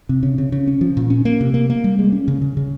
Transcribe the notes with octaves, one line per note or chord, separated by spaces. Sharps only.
C3
C#3
C#3
C#3
C#4
F3
A#2
C#4
A#3
C3
A#3
A#3
G3
G#3
C#4
C#3
C#3
C#3